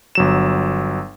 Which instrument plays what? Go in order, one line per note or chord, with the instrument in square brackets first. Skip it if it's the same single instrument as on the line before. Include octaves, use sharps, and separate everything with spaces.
[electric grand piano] G1 F#3 E7